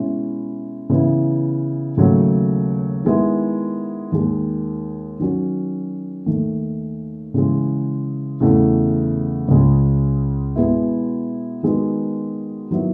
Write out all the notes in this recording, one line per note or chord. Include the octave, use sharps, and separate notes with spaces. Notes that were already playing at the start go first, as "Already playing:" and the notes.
Already playing: B2 G#3 C#4 E4
C#3 E3 B3 E4
D#2 C#3 F#3 A3
D#3 G#3 B3 E4
D#2 D#3 G#3
D#3 F#3 C#4 F#4
D#2 D#3 A3
C#3 E3 G#3
E2 C#3 E3 A3
C#2 C#3 G#3
B2 G#3 B3 E4
D#3 G#3 B3 D#4 F#4
D#3 F#3 B3 E4